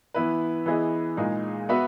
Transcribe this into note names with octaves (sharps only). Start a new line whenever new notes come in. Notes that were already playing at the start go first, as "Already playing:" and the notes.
E3 B3 E4 B4
E3 B3 E4 G#4 D#5
A#2 G#3 D#4 G#4
B3 F#4 B4 E5